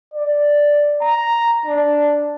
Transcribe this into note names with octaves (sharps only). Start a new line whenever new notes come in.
D5
A#5
D4